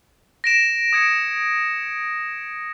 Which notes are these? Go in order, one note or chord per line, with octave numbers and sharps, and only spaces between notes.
A#6 D7 E7
D#6 G#6 C#7 D7